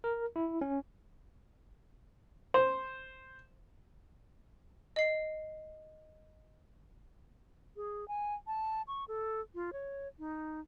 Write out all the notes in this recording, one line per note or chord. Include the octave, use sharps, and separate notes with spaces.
A#4
E4
C#4
C5
D#5 C7
G#4
G#5
A5
C#6
A4
F4
C#5
D#4